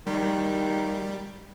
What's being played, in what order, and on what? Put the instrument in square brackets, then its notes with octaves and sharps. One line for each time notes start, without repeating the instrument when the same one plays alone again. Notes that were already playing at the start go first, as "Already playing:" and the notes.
[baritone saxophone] D#3 [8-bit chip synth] G3